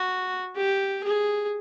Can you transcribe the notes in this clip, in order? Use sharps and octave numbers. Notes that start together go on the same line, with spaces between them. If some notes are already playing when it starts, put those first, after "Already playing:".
Already playing: F#4
G4
G#4